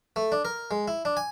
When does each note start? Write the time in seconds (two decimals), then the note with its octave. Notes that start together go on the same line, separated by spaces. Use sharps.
0.16 A3
0.32 D4
0.45 A#4
0.71 G#3
0.88 E4
1.05 D4
1.17 G#5